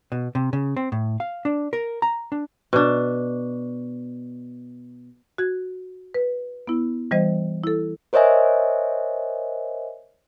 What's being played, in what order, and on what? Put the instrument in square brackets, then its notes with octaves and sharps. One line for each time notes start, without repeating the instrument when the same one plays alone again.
[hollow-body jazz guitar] B2
C3
C#3
C4
A2
F5
D4
A#4
A#5
D4
[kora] B2 D4
[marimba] F#4 G#6
B4
B3 E4
E3 G3 C5 D#5
E4 A4
[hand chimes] A#4 C5 C#5 D#5 E5 G#5